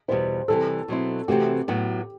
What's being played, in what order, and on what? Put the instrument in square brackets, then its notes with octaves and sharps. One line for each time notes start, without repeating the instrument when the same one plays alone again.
[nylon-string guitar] E2 B2 G3 B3 E4 [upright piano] C5
[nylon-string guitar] C3 E3 G3 [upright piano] A4
[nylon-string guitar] B2 F#3 C4 E4
[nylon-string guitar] C3 E3 A3 C4 F#4 [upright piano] G4
[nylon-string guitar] A2 F#3 B3 F#4